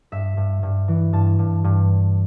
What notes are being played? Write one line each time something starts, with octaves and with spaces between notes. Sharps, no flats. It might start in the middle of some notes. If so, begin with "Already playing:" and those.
G2 E5
G2
G2
E3
G2 A5
G2
G2